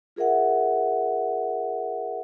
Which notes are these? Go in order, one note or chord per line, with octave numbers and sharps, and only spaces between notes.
F4 G#4 A#4 E5 F#5